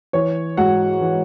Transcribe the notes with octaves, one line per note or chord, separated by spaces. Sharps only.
E3 C#5
G#2 F#4 F#5
E3